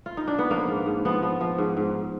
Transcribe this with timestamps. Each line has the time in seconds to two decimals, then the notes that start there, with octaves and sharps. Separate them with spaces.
0.06 F4
0.17 D#4
0.28 D4
0.39 B3
0.50 F3 A#3
0.68 G#2
0.86 G#2
1.05 F3 B3
1.22 F3
1.41 F3
1.58 G#2
1.77 G#2